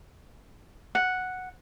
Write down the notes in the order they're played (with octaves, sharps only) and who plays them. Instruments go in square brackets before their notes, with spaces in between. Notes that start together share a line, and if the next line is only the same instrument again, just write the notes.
[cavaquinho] F#5